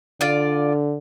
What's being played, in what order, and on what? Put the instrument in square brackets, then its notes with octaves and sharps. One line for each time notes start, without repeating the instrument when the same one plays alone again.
[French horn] D3 [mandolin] F4 D5